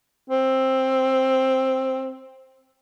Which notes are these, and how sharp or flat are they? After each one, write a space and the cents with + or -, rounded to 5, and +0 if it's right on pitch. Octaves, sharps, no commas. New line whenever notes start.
C4 +10